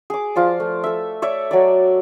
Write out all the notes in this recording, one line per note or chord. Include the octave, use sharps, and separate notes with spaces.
G#4 D6
F3 F4 D5 A5
A3
A4 E5
C#5 D5 E5
F#3 A4 D5